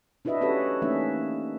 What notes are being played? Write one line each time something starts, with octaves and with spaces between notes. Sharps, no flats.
D4 E4 F#4 B4 D#5 E5
C#4 F#4 G4 A4 B4 C#5
E3 A3 A#3 C#4 D#4 E5